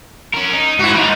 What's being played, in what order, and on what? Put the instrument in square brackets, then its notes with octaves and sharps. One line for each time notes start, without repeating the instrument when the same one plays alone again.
[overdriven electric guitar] C#4 A#4
D#4
[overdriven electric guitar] G#2 [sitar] E4 F#4
[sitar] D#2 D#4 [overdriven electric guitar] G3